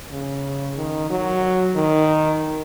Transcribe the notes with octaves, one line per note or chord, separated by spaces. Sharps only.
C#3
D#3
F#3
D#3